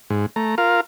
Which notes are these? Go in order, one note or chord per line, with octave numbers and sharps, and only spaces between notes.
G#2
A3 A#5
F4 A#4 F5